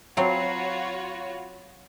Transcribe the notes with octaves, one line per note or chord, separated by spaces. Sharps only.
F#3 C4 F4 F#4 C#5 F5 B5 C7